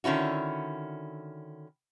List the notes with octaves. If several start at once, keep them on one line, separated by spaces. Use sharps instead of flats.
D3 D#3 C#4 E4 F#4